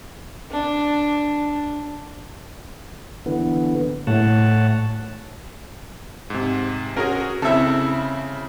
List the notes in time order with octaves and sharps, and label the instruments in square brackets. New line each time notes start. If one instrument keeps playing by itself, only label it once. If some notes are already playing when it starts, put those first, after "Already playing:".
[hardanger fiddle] D4
[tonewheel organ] D3 E3 B3
[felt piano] A2 [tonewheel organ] C#5 F#5 A5
[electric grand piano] G#2 C3
[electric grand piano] C#4 F#4 G#4 [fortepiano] A#4
[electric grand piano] C#3 C4 E4 [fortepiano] A4 E5